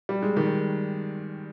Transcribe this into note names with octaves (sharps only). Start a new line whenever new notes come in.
G3
G#3
D#3 G3